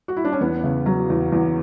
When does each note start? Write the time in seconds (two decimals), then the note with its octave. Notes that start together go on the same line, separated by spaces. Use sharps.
0.08 F#4
0.17 E4
0.25 D4
0.32 C#4
0.40 E2 B3
0.64 C#3
0.86 F#3
1.10 E2
1.32 E2